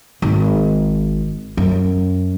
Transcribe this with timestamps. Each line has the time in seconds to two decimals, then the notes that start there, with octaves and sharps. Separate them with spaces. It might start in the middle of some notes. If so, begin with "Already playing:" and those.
0.22 G#1
1.57 F#2